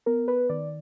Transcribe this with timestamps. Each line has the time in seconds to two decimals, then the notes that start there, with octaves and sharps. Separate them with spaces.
0.06 B3 A#4
0.28 B4
0.49 D#3 D5